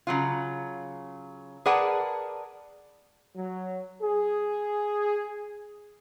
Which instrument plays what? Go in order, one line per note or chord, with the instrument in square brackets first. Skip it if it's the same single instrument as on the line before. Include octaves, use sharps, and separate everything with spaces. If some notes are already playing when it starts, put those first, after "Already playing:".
[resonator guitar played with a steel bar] C#3 F#3 F4
G#4 A#4 B4 D5 F#5 A5
[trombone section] F#3
G#4